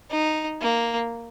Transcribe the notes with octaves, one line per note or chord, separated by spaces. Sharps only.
D#4
A#3